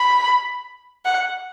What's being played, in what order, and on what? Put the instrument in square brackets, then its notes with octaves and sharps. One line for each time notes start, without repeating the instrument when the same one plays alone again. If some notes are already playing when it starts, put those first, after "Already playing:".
Already playing: [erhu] B5
F#5